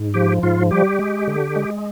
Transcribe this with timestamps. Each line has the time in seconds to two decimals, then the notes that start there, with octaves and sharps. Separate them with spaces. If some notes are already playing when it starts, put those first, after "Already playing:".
Already playing: G#2
0.14 F3 G4
0.43 G#2 F4
0.71 G3 G4
0.99 G#3
1.28 D3
1.56 G#3